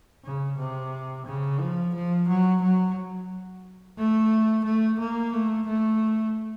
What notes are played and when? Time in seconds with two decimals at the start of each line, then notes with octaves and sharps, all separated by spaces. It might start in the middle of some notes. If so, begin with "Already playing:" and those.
0.24 C#3
0.58 C3
1.26 C#3
1.60 F3
1.94 F3
2.28 F#3
2.62 F#3
3.98 A3
4.64 A3
4.99 A#3
5.33 A3
5.66 A3